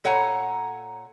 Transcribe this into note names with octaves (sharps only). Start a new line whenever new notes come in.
A#2 A4 C#5 F#5 G#5 A#5